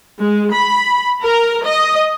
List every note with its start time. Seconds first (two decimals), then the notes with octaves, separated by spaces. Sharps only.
0.20 G#3
0.53 B5
1.22 A#4
1.65 D#5